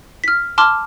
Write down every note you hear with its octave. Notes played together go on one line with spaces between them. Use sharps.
F6 B6
A5 C6 D6 F6